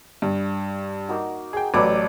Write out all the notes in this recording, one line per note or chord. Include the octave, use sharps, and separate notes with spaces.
G2
A#3 D#4 F#4
G#4 G5
A1 F#3 A4 B4 D5 D6